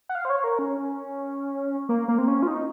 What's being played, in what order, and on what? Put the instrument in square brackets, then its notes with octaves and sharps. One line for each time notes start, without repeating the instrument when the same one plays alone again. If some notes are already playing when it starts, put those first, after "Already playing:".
[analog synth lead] F#5
F5
C5
C#5
A#4
C#4
A#3
A#3
C4
C#4
F4
D#4